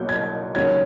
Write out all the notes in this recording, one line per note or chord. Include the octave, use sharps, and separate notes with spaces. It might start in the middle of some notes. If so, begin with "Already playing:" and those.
Already playing: B1 B2 F#3 A#3 G6
G#6
D#2 C#3 F#3 G#6